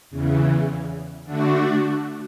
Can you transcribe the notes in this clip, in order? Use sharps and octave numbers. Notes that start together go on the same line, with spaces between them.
E2 C#3 E3
D3 A3 D4 F#4